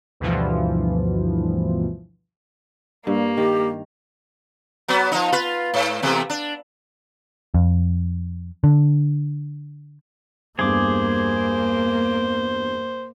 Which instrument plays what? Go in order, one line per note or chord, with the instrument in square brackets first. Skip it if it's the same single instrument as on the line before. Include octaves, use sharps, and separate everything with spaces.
[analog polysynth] D2 G2 B2 E3 F3
[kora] G2 [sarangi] A#3
[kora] D#3 [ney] G4
[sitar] F#3 B3
F3 D#4
F4 B4
G#2
E2 C3 A3
D4
[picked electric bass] F2
D3
[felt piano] E2 G2 [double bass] A#3 [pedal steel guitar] G#4 D6 [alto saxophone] C5